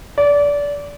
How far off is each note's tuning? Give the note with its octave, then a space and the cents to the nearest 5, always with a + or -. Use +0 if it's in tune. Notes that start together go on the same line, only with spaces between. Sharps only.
D5 -25